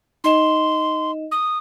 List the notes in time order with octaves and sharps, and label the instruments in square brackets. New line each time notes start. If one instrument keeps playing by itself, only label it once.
[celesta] D#4 D#5 E7 [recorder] C6
[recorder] D#6